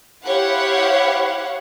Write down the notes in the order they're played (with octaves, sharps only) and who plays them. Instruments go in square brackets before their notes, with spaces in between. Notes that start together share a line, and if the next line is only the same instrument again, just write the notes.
[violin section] E4 G4 C5 C#5 F5 F#5